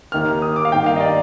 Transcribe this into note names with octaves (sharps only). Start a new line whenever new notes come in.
D#2 D#3 A#3 F6
D#6
D6
F5
G2 D#3 A#3 G5
F5
D#5
D5